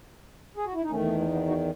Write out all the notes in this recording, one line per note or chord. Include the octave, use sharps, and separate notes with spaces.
G#4
F#4
E4
D#4
E2 D#3 A3 C#4
B3
A3
B3
D#4 F#4